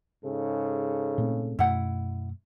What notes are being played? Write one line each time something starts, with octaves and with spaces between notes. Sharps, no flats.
G#2 C#3 A4
A#2 A3 C4
F#2 B2 A3 E4 F#5